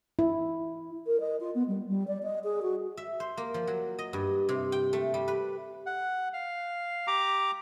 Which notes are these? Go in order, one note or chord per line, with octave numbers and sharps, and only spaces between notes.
E4
A#4
D#5
F4
B3
G3
G3
D5
D#5
G#4
F#4
E5
C5
A#3
F3
F#3
D#5
G2
C3
G5
A3
G3
B4
F#5
F5
G4 A#5 D6